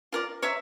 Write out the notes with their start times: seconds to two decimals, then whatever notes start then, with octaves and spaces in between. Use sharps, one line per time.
0.12 F4 A#4 D5
0.42 C#5 E5 A#5 C#6